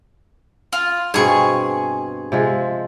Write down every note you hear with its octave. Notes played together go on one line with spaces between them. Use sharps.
F4
G2 B2 C4 G#4 C#6
C3 F3 G#3